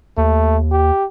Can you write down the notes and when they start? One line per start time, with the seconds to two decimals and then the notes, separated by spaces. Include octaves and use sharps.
0.17 D#2 A3
0.71 G4